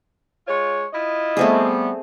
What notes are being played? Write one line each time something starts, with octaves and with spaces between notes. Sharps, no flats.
G#3 F4 C#5
E4 F4 D#5
G3 A3 B3 C4 G#4